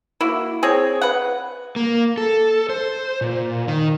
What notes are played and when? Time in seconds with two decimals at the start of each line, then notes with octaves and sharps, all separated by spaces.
0.21 A#3 E4 F#4
0.63 C4 G#4 C#5
1.02 B4 F#5
1.76 A#3
2.18 A4
2.69 C5
3.21 A#2
3.67 D#3